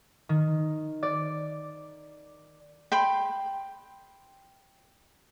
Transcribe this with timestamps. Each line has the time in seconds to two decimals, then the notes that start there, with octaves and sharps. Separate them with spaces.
0.29 D#3
1.03 D5
2.92 G5 B5 C6